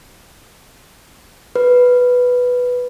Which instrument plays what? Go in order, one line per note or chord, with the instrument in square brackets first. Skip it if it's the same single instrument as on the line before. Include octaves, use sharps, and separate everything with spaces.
[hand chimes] B4